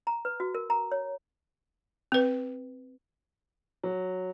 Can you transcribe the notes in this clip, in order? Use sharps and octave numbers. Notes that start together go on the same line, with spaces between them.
A#5
B4
F#4
A#4
A#5
C#5
C4 B4
F#3